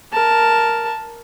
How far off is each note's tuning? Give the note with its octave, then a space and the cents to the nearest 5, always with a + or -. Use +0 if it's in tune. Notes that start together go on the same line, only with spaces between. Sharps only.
A#4 +0 A5 +0